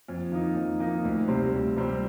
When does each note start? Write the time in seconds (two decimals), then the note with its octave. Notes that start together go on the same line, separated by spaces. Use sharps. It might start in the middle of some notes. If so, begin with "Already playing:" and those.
0.08 F2
0.32 D#3 A#3 D#4
0.56 F2
0.80 D#3 A#3 D#4
1.05 D2
1.28 C3 G3 C4
1.52 D2
1.76 C3 G3 C4